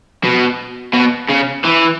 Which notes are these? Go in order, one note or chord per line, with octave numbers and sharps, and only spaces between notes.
B2
B2
C#3
E3